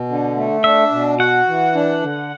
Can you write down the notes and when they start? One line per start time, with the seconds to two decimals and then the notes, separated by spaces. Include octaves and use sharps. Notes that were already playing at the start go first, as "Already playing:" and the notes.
Already playing: B2
0.09 D3
0.36 A3
0.64 D4 E5
0.92 B2
1.19 F#4 F#5
1.47 E3
1.75 D4
2.02 D3